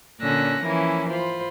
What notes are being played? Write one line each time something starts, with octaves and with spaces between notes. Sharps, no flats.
A#2 D3 C#4 E6 F#6 A#6
E3 F3 A#3 C#4 E4
F4 C5 B5